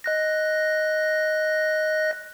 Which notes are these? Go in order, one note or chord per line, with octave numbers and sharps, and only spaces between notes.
D#5 F#6 A#6